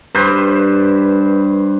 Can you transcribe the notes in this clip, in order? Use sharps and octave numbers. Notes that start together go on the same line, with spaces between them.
G2 B4 C5